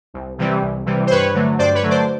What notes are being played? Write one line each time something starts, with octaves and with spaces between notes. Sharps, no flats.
C2
C3 E3 G3
C2
C3 E3 G3
C5
G2 B4 C#5
D3 F#3 A3
G2 C5 D5
B4 C#5
D3 F#3 A3
C5 D5